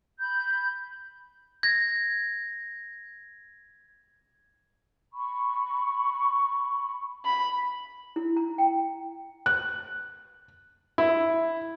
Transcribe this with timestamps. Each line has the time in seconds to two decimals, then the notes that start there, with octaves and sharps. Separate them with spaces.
0.19 B5 G6
1.63 G#6 A#6
5.12 B5 C#6
7.25 B5
8.16 E4
8.37 A#5
8.58 G5
9.46 F#6
10.98 E4